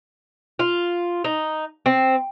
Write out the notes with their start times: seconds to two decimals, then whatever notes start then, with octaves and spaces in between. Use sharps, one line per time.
0.59 F4
1.24 D#4
1.86 C4